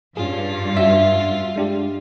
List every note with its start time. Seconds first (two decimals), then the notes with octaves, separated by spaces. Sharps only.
0.17 G2 C#4 F4 G#4
0.77 C#4 D4 F#4 E5
1.56 G#3 D4 G4